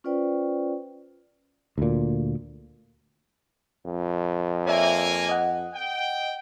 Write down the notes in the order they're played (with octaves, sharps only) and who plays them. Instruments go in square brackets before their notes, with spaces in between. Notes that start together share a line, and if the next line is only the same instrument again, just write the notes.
[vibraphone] C#4 F4 B4 C5 D5 G5
[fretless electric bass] D2 A#2
[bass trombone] F2
[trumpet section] A#3 G#5 [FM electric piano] C#5 D5 E5
[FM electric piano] D#5 F#5
[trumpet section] G5